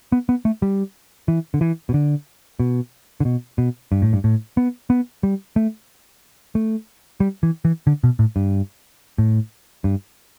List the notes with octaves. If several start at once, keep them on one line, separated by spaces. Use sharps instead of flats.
B3
B3
A3
G3
E3
D3
E3
B2
D3
B2
D3
B2
B2
G2
A2
G2
A2
B3
B3
G3
A3
A3
G3
E3
E3
D3
B2
A2
G2
A2
G2